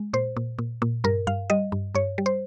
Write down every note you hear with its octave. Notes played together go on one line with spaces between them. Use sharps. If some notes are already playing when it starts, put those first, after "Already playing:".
Already playing: G#3
A#2 C5
A#2
A#2
A#2
G2 A#4
G2 F5
G3 D#5
G2
G2 C#5
G3
C5